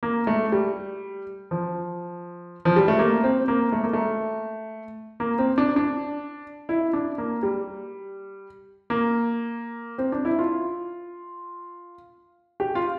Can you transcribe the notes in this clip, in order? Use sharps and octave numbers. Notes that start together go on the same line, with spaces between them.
A#3
A3
G3
F3
F3
G3
A3
A#3
C4
A#3
A3
A#3
A3
A#3
C4
D4
D4
E4
D4
A#3
G3
A#3
C4
D4
E4
F4
G4
F4